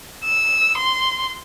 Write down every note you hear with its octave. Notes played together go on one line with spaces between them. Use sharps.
E6
C6